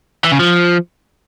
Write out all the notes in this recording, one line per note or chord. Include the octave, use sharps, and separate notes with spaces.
E3
C#3
F3